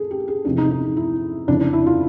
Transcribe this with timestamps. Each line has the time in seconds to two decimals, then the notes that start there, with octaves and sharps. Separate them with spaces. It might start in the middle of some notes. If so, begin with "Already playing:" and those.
Already playing: G#4 A4
0.11 G4
0.28 G#4
0.45 E2 C3 F3 D4
0.58 D#4
0.71 D#4
0.97 E4
1.48 F2 C#3 E3 D4
1.61 D4
1.73 E4
1.86 F4